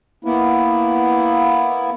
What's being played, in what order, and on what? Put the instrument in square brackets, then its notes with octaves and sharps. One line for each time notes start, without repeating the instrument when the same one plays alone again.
[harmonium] A#3 B3 E4